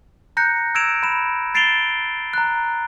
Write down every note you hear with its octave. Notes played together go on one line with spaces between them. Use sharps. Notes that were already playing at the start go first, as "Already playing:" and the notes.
A#5 F#6 G6 A#6 C#7
E6 G#6 A#6 D7 E7 F7
B5 E7
A6 C7 D7 E7 F7 G7
A#5 F#6